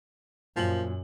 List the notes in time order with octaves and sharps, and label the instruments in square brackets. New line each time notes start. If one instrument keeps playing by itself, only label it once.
[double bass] F#2 [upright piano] A#2 F#7 [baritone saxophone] F3